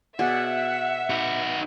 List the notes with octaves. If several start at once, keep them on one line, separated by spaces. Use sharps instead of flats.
B2 G#4 D5 E5 F#5
D#4 F#4